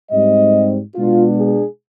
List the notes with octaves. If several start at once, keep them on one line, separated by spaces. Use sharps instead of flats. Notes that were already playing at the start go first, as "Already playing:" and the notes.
G#2 G3 C4 D#5
B2 G#3 B3 D4 F4
G#4